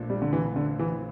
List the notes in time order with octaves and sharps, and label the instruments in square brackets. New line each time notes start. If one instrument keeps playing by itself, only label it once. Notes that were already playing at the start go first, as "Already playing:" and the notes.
Already playing: [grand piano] A#1 A#2 A3 D4 A4
[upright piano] G3
D3
E3
D3
E3